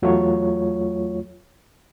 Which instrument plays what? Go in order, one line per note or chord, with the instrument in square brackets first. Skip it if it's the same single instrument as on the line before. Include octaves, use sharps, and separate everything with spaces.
[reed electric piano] E2 F#3 A3 F4 C#5